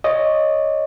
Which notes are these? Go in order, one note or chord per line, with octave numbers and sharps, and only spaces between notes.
C#5 D#5